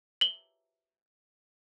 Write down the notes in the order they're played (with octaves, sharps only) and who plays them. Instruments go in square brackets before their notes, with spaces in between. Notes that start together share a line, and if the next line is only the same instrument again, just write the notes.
[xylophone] F#7 G7